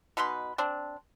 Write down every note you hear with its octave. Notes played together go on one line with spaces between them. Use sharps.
B2 D#4 B4 C6
C4 D4